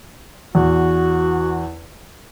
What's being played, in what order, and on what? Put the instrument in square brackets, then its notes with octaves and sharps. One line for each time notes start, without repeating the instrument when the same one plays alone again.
[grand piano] E2 [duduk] F#4